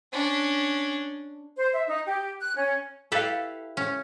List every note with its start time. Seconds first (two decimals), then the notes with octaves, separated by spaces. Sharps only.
0.12 C#4 D4
1.58 C5
1.73 E5
1.88 D#4
2.06 G4
2.41 F#6
2.56 C#4
3.12 E4 G4 A4 B4 F5
3.77 C#4